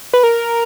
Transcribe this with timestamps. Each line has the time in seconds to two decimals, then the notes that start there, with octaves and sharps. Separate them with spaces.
0.13 B4
0.23 A#4